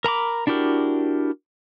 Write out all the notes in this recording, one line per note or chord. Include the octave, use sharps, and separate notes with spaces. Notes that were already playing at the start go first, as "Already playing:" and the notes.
A#4 A#5 B5 D6
D4 E4 F#4 G4 A#4